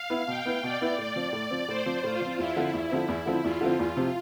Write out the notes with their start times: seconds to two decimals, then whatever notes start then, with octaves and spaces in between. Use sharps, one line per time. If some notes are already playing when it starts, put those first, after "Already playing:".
Already playing: F5
0.10 B3 E4 B4
0.27 B2 G5
0.45 B3 E4 B4
0.63 B2 D5
0.81 B3 E4 B4
0.98 A2 D5
1.16 F3 C4
1.33 A2
1.50 F3 C4
1.68 A2 C5
1.86 F3 C4
2.04 A2 F4
2.21 F3 C4
2.38 E2 E4
2.56 D3 F3 C4
2.74 E2 E4
2.91 D3 F3 C4
3.08 E2
3.26 D3 F3 C4
3.44 E2 F4
3.61 D3 F3 C4
3.79 E2
3.97 C3 F3 C4